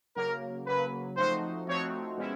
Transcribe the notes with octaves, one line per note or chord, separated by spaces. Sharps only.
C#3 F#3 A#3 A#4
C#3 F#3 A#3 B4
F3 A3 C4 D#4 F#4 C5
F3 A3 C4 D#4 F#4 C#5
B2 G#3 C#4 E4